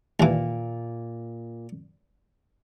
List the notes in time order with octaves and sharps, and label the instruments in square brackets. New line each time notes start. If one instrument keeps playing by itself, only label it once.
[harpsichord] D#2 E3 [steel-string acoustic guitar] A#2